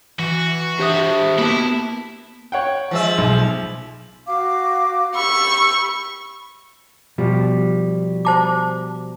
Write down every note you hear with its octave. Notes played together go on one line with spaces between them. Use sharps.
E3 F#4
D4 G4 C5 E5 D#6
A#3 B3 E4 F#4 G4 A#4 A5
C#5 F#5 G5
F3 G#3 E5
B1
F#4 F5 D6
G4 B5 C#6 E6
B2 F3 G3
C5 A5 D6